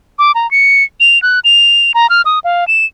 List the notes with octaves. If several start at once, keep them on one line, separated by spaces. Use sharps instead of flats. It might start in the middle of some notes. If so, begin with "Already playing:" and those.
D6
A#5
C#7
F7
F#6
F7
A#5
F6
D#6
F5
E7